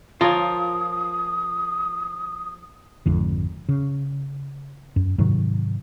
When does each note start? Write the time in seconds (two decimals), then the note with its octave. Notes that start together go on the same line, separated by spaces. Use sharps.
0.21 F3 F4 A#4 C#5 D#6
3.06 G#1 F2 D3
3.69 C#3
4.96 F#2
5.18 G#2 C3 D#3 F#3